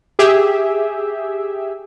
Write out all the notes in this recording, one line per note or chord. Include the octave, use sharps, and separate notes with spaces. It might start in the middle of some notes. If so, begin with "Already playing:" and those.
G4 G#4 E5